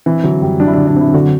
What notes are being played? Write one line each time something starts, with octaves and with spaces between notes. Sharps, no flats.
E3 C4
D3 F#3
F#2 G3
F#3 D4
E4
D3 D4
D4
C4 E4
D3 F#4